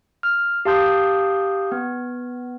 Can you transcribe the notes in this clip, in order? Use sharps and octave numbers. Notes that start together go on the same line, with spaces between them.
F6
G4 F5 A5 C6 D#6 G6
B3